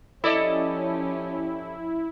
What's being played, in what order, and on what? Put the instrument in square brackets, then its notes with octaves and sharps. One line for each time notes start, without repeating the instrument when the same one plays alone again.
[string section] F3 C#4 G4 [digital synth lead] E4 [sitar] A4 D5 D#5